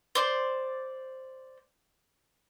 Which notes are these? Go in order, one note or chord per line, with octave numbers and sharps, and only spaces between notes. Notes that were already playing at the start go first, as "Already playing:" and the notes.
C5 D5